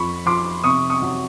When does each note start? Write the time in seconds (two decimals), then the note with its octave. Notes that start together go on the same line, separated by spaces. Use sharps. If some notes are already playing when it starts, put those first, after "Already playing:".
Already playing: F2 B5 C#6
0.26 F3 C6 D6
0.64 C3 C#6 D#6
0.90 C#6 D#6
1.02 F#3